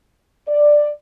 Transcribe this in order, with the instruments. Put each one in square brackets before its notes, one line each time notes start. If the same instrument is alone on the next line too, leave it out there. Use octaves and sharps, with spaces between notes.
[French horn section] D5